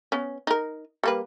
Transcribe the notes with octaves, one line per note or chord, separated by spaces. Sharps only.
B3 C#4
D#4 A#4
G3 A#3 B4